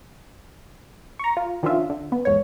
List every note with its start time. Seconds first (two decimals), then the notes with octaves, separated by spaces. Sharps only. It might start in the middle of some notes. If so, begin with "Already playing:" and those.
1.19 A#5 C#6
1.37 F4
1.63 D#3 F3 C#4 D4 F4 E5
1.90 D3
2.12 B3
2.25 E2 G#2 C#5